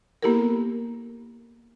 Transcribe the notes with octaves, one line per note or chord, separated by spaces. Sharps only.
A#3 B3 E4 G4 A4 A#4